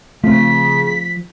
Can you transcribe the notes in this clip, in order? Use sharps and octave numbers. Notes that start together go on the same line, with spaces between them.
C#3 F3 A3 C4 B6